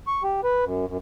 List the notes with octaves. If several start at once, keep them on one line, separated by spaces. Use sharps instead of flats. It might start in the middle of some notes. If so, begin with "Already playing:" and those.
C#6
G4
B4
F#2
F#2